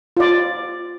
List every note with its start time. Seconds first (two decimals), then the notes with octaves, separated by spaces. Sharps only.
0.17 F4 D5